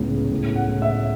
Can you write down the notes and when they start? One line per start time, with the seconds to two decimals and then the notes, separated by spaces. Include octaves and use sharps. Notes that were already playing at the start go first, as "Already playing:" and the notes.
Already playing: C#2 A2 B3
0.31 A2
0.56 F#5
0.69 A2
0.82 E5